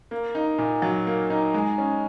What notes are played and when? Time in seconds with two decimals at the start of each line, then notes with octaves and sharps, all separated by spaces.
0.11 A#3
0.35 D#4
0.58 A#2
0.82 F#3
1.07 A#3
1.30 D#4
1.54 G#3
1.78 C#4